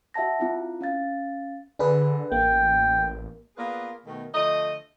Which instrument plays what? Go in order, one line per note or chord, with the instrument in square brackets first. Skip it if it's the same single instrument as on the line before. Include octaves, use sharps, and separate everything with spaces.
[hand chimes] F#4 E5 F#5 A5 A#6
C4 E4 F4
C#4 F5 A6
[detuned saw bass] D3 [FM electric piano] D4 G#4 B4
[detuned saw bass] A1 [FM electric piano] A#3 [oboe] G5
[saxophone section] A#3 B3 F4 G#4 B4 D5
B2 D#3 A3
D3 F3 A3 D#5